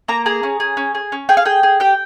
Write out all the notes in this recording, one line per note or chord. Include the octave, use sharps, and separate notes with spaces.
A#3 A#5
G#4 A#5
C#4
G#4
C#4
G#4
C#4
G#4 G5
F5
G#4 G5
G#4
G4 G5